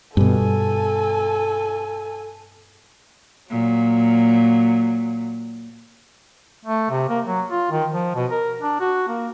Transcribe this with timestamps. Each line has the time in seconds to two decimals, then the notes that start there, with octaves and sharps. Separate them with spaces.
0.17 G2 B2 A4 G#5
3.50 A#2 F#3
6.66 A3
6.91 C3
7.09 A#3
7.27 F#3
7.51 F4
7.71 D#3
7.92 F3
8.16 B2
8.31 A#4
8.60 D4
8.80 F#4
9.08 A#3